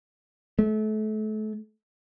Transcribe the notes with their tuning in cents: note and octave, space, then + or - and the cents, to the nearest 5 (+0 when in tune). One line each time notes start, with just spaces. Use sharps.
A3 -35